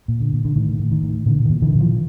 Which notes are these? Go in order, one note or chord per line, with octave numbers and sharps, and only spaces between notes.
A#2
D3
A#2
D3
A2 D#3
A2
D#3
A2
A#2 D3 E3
A#2 D#3
D3 E3
A#2
D#3 F3